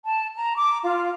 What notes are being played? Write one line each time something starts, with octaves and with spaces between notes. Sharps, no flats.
A5
A#5
D6
F4